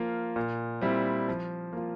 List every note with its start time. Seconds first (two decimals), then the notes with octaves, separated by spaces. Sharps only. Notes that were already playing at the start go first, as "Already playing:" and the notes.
Already playing: F3 A#3 F4
0.36 A#2
0.81 G3 C4 E4
1.28 F3
1.73 A#3 F4